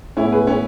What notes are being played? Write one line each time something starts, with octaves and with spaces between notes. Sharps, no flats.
A2 G#3 B3 C#4 E4
G#4 B4
C#4